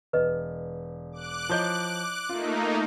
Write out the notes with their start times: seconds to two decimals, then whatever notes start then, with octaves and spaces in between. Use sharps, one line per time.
0.13 E1 B4 D#5
1.12 D6 F#6
1.49 F3 E4 C#5 D#5 G6
2.29 A3 A#3 D#4 F4